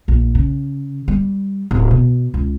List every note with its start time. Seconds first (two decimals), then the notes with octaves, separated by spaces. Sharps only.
0.08 A#1
0.35 C#3
1.08 G3
1.71 D1
1.91 B2
2.34 C#2